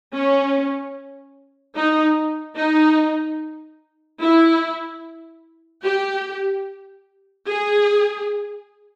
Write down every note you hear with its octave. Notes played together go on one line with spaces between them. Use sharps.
C#4
D#4
D#4
E4
G4
G#4